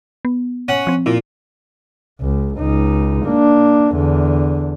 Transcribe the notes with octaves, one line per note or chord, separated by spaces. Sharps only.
B3
C#4 F#5
F3 C4
A#2 E4
C#2
C#2 D#4
A#3 D4
E2 D3